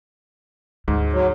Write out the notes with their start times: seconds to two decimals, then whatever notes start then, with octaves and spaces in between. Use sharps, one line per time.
0.88 D2 G#2
1.13 F#3